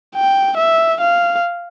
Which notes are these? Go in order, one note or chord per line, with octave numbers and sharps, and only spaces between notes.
G5
E5
F5